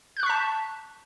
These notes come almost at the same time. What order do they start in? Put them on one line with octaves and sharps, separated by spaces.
G6 F#6 C#6 B6 A5